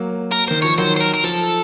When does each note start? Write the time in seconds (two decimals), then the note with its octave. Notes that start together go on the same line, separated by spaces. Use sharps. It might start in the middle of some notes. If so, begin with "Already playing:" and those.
Already playing: F#3 A#3
0.32 A#4
0.48 D#3 C5
0.62 F3 C#5
0.78 D#3 F#3 C5
0.96 C5
1.00 A#4
1.14 A#4
1.24 F3 A4